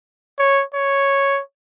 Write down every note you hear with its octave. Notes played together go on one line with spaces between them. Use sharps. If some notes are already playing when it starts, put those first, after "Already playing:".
C#5
C#5